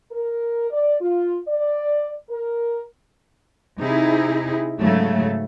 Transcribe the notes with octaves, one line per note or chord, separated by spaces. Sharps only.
A#4
D5
F4
D5
A#4
C3 D#4 E4 G#4
G#2 C#3 F#3 A3